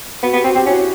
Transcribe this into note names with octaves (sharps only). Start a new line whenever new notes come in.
B3 F#4
B3 G4
C4 F#4
C4 G4
C#4 E4 F#4